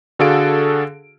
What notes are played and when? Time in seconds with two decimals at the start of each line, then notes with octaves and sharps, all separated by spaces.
0.19 D3 F#4 G#4 A4 F5 D7